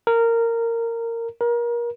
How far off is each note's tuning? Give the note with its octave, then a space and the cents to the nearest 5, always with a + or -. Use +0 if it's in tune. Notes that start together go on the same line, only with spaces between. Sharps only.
A#4 -15
A#4 +30